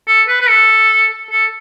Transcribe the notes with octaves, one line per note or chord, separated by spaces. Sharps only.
A4
B4
B4
A4
A4